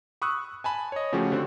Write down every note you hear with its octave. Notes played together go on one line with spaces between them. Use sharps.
B5 C#6 D#6 E6 F#6
G#5 A5 B5
C#5 D#5
C#3 F3 A3 C#4 F#4 G4
D3 C4 F#4